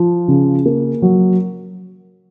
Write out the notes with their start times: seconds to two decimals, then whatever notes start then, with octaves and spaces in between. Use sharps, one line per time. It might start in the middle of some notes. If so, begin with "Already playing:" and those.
Already playing: F3
0.28 C#3
0.66 A#3
1.02 F#3